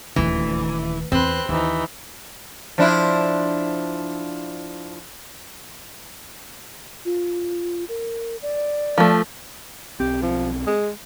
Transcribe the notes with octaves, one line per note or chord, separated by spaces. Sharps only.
D#1 D2 D#3 E3
E2 C4 B4 C6 F#6
D#2 E3 D#4
F3 D4 E4
F4
A#4
D5
F3 A3
B1 C4 G4
F3
G#3